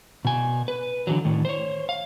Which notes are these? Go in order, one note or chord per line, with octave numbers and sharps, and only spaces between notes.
B2 G#5
B4
D3 E3 F#3
A2 D#3
C5 C#5
F5